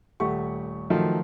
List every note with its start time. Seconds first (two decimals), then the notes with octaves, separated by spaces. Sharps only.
0.20 D#1 A3 G4 F#5 C#6
0.90 D#3 F3 F#3 A3